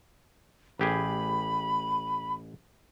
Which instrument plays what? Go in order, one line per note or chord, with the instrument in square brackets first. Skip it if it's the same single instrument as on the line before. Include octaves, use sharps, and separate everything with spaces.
[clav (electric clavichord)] A1 G4 G#4 [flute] B5